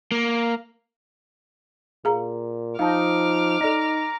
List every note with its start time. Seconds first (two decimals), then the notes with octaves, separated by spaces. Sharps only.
0.12 A#3
2.05 A#2 G#4 F5 A#5
2.79 F3 D#4 F5 A5 D6 F6
3.61 D#4 A4 D5 D#5 A#5